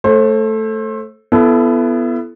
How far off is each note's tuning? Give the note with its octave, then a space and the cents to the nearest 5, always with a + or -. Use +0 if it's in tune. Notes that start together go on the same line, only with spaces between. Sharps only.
A3 +0 C5 +35
B3 +5 E4 +30 A4 -15